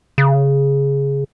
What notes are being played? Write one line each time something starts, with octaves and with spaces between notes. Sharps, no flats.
C#3